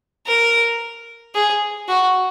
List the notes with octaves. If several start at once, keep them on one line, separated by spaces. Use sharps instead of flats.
A#4
G#4
F#4